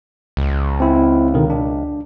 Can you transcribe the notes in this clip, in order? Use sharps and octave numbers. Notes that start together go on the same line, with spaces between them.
C#2
C4 E4
B2 D3 D#3
D4